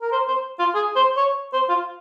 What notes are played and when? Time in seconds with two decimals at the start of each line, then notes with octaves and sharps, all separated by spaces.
0.02 A#4
0.11 C5
0.28 C5
0.59 F4
0.75 G#4
0.96 C5
1.17 C#5
1.53 C5
1.69 F4